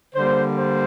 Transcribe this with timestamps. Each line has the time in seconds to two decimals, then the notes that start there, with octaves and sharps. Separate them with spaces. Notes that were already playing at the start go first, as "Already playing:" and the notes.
0.14 D3 G3 A#3 C5
0.57 C5